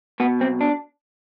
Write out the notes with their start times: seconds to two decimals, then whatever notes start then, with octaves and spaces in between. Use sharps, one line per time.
0.20 B2 B3
0.40 B1 C4
0.61 D4